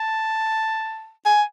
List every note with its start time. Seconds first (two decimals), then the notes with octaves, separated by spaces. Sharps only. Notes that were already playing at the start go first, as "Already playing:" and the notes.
Already playing: A5
1.26 G#5